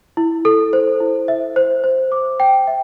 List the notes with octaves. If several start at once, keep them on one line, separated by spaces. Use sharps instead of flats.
E4
A4
C5
E4
E5
C5
C5
D6
G5
E5